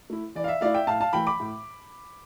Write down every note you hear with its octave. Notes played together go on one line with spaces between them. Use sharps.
A3 E4
E3 D5
F5
E5
A3 E4 D5 F5
E5 G5
A2 F5 A5
F5 A5
E3 A3 G5 B5
B5 D6
A2